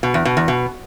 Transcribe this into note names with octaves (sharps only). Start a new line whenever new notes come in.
B2
E2
B2
E2
B2